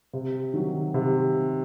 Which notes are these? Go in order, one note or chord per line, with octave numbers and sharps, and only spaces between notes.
C3
D#3 F#3
C3